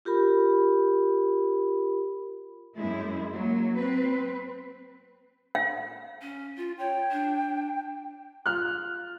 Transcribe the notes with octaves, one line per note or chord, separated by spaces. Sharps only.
F4 G4 A#4 B5
F#2 G#3 E4
F#3 A#3
C4 B4
F5
C#4
F4
C#5 G5
D4
F4 F6 F#6